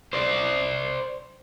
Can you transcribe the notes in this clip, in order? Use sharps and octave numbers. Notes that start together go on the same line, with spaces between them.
C5 D5